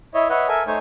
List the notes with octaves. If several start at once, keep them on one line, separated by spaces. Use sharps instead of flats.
E4 C#5 D#5 E5
B4 C#5 D#5 E5 F#5
A4 A#4 E5 G#5
A3 D#4 C5 C#5 G#5